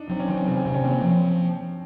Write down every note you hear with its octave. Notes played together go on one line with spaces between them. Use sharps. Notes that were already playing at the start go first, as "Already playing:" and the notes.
Already playing: D4 D#4
F#3 C4
C#4
D#3 C4
C#4
C3 C4
C#4
C3 C4
C#4
A#3 C4
C#4
F3 C4